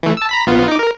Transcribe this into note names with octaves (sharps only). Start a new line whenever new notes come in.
E3 A3
A5 E6
A#5 B5 B6
A#1 B3 F4
D#4 D6
A#4